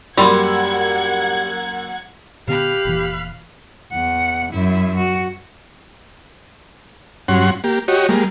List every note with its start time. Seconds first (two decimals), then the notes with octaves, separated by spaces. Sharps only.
0.18 F#2 G3 A#3 F#5 B5 C6 E6 G#6
2.48 A#2 D3 B3 G4 F5 B5 F#6
2.85 F1 A#2 E3
3.93 E2 F#5
4.53 F#2 E4
4.97 F#4
7.28 G2 F#3 C#4 F#5 C6
7.64 A#3 G4
7.88 F#4 G4 C#5 D#5
8.09 G3 G#3 A#3